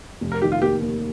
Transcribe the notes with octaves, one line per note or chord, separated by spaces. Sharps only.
F1
A#4
D#3 G4
F4
A#3 G4
D#2